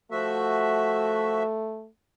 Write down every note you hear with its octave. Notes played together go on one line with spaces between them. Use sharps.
F3 A3 F#4 E5